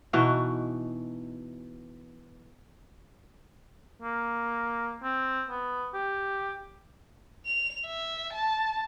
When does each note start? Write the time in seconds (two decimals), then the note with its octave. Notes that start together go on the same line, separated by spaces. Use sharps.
0.13 B2 E3 D#4 F#4
4.02 A#3
5.03 C4
5.49 B3
5.94 G4
7.46 F7
7.86 E5
8.33 A5